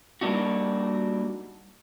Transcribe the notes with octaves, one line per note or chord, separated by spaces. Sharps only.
G3 A#3 D4 D#4 F#4